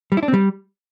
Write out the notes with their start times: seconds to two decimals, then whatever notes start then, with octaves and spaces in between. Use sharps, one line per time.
0.12 G3
0.17 E4
0.23 D4
0.28 C4
0.34 G3